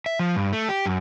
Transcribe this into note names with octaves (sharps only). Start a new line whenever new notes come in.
E5
F3
G2
A3
G4
F#2